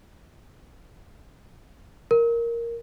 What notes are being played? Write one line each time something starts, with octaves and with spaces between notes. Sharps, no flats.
A#4